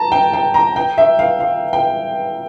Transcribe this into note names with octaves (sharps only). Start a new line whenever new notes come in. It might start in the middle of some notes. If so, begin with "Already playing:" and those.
Already playing: A5 A#5
G5
G5
A#5
G5
E5
F5
F5
G5